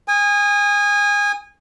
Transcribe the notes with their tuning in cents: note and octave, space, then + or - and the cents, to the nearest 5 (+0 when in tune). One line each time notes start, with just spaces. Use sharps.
G#5 -25 D#6 +0